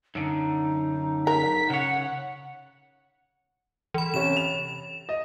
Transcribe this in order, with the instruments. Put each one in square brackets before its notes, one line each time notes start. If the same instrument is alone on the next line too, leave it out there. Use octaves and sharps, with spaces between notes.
[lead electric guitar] F#2 D3 [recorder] D#4
[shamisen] A#4 [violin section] B6
[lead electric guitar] C#3 C#5 [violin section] F#5
[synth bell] E3 B5
[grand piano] C3 C#4 [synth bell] E7
[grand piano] F7
D#5